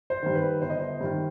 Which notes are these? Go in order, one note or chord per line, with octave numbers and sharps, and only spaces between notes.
C5
G2 D#3
B4
G1 C5
D#5
C5
G2 D#3